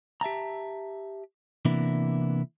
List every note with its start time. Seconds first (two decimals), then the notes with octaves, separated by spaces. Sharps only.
0.21 G4 E5 A5 A#5
1.65 C3 E3 A#3 B3 D4 E4